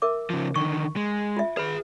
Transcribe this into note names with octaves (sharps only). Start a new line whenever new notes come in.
A#4 E5 D6
C#3 F3
D3 D#3 C#6
G#3
F4 E5
G#4 B4 B5